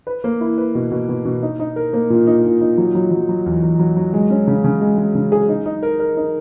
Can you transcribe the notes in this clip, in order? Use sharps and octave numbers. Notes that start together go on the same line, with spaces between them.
B4
A#3
E4
B4
B2
B2
B2
B2
D#4
D#4
A#4
A#3
A#2
D#4
A#2
D#4
F#3
F#3
F#3
F#3
E2
E2
F#3
F#3
G#3
C#4
C#3
C#3
G#3
G#3
C#3
G#4
D#4
D#4
A#4
A#4
D#4